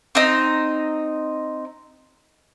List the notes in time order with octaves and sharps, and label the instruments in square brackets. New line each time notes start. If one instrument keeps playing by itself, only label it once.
[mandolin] C4 D#4